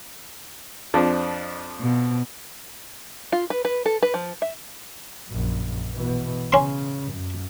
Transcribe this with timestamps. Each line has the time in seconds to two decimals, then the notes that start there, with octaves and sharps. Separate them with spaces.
0.94 F2 F3 D4
1.81 B2
3.32 F4
3.50 B4
3.65 B4
3.86 A4
4.03 B4
4.14 F3
4.42 E5
5.29 A#1 F#2
5.94 B2 E3
6.52 C#3 C#4 C6
7.12 F#2